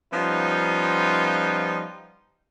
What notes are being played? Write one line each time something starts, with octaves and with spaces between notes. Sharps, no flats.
F3 G3 B3 C#4 D#4 F4